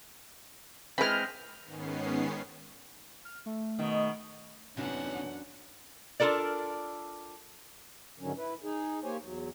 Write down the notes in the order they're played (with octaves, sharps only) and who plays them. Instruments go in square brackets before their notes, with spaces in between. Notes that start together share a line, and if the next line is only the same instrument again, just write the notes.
[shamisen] E3 G#4 B4 [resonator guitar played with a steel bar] G#3 C4 [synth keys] B5 F6
[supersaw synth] G#2 D#3 B3 C#4 C7
[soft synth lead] F6
A3
[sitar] B2 D#3
[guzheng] F#2 D4 F#4 [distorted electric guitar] C3 D#3 [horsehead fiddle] B3 F#5 [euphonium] C#4
[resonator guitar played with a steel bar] D4 F4 A4 A#4 D5
[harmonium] G#2 D3 D#3 F#3 C#4
E4 B4
D#4 G#4
A#3 G4 C5 C#5 G#5
E2 F#3